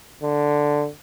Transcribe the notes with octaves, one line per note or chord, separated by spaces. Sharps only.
D3